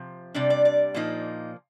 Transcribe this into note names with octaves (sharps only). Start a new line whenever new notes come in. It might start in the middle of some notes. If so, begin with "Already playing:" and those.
Already playing: C3 F3
C3 G3 D4 D5
D5
D5
A#2 F3 A#3 D#4